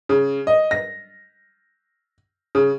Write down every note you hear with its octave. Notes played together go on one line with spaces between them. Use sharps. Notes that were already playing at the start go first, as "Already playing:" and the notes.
C#3
D#5
A#6
C#3